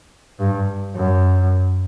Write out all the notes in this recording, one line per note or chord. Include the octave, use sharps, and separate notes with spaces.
G2
F#2